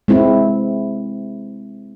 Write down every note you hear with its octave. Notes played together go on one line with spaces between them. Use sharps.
G#3 C4 E4